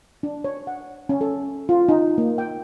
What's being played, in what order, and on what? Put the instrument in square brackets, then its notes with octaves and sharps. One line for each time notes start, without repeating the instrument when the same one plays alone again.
[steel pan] D4
C#5
F#5
C#4
A4
F4
D#4
A#3
G5